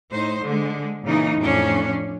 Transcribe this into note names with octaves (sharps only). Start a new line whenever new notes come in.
A2 D#4 C5
D3 G#3
A#2 C#3 E3 D#4
F2 A2 C#4 D4